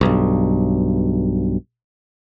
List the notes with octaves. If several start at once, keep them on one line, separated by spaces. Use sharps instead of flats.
B1 G2